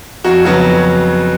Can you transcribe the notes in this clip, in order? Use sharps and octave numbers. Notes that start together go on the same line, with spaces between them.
F2 F#4
C#3 F#3 B3 F#4